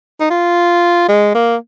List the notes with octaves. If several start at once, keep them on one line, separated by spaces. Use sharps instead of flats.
D#4
F4
G#3
A#3